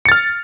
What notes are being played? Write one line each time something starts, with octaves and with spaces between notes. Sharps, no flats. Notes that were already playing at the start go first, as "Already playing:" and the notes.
F6 A6 C#7